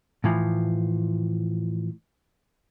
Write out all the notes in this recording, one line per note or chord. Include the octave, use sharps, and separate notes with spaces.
A2 E3 F3